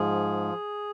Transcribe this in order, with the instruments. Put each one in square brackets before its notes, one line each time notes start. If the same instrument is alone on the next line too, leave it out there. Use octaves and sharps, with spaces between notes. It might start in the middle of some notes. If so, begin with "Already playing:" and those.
Already playing: [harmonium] G#2 F3 G#4